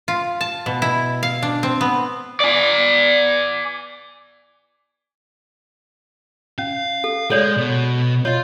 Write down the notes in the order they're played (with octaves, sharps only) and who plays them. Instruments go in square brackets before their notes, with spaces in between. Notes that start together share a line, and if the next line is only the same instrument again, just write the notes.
[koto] F4
A5
B2
E4
F5
D4
C4
B3
[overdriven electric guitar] D5 G#5
[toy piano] C#4 [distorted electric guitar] F5
[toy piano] A4
[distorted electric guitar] G#3 [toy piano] A4 C#5 D5
[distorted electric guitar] B2
[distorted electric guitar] F4 [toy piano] C#5 D#5